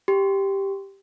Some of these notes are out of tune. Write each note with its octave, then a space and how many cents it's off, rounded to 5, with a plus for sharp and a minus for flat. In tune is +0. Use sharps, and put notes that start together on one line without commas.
G4 +0 C6 -10